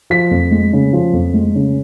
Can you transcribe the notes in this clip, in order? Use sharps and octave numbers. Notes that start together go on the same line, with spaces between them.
F3 B6
F2
G#3
C#3
F3
F2
G#3
C#3